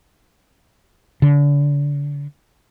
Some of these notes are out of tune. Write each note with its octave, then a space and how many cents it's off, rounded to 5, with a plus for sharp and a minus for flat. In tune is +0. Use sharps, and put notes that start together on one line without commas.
D3 -35